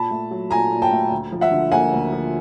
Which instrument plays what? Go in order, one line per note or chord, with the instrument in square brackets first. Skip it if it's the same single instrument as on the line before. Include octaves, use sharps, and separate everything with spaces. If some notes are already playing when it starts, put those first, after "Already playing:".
Already playing: [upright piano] A#2 A5 B5
A3
F#3
A#2 G#5 A#5
A#2
G5 A5
A3
D2
F3
E5 F#5
D3
A#3 F#5 G#5
D2
F3